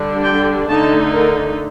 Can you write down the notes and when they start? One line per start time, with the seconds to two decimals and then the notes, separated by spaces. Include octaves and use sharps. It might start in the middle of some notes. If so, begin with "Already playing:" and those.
Already playing: D3 G3 D4
0.25 G5
0.68 D3 A3 D#4 A5
1.12 A#4